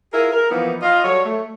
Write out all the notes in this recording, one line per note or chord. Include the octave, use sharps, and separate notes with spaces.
E4 F4 G#4 A#4
A#4
E3 F3 A#3 B3 D#4 E4
F4 D#5
F#3 G3 A4 C#5
A3